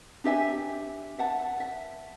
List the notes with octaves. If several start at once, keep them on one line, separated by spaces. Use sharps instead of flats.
D4 G4 E5 G#5
E5 F#5 A5
E5